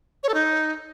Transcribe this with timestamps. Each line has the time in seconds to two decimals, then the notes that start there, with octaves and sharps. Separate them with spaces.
0.23 C#5
0.29 A4
0.34 D#4